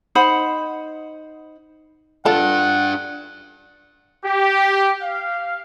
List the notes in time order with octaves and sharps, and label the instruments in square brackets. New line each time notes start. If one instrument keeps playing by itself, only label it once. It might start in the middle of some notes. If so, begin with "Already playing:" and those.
[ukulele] D#4 C5 F#5 B5
[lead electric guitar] D4 G4 [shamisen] F4 A4 [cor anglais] F#5
[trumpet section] G4
F5